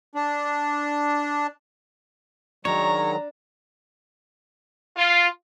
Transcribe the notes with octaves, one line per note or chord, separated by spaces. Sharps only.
D4
D#3 F#3 G#3 D4 C#5 A#5
F4